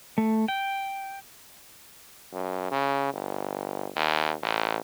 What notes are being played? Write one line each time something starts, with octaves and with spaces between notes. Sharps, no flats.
A3
G5
F#2
C#3
G1
D#2
A1